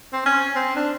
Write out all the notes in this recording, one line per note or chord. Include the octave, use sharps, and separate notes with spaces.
C4
C#4
C4
D4